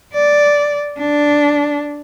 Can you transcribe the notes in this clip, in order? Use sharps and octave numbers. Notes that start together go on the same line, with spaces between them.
D5
D4